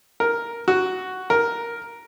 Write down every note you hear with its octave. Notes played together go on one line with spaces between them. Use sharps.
A#4
F#4
A#4